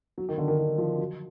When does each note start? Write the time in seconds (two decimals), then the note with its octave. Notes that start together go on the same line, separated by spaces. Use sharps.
0.18 F#3
0.29 D#3
0.38 D3
0.48 D#3
0.58 D#3
0.78 F3
0.98 F#3